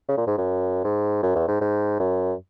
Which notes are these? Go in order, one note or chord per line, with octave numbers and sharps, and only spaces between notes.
C#3
A#2
G#2
F#2
G#2
F#2
E2
G#2
G#2
F#2